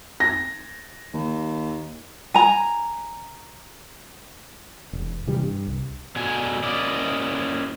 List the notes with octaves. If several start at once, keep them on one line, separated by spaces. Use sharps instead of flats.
A#6
D#2
G#5 A#5
E1
C3 E3 G3
G2
C2
B2 D3 G#5
A#3 C#4 E4 D5 D#5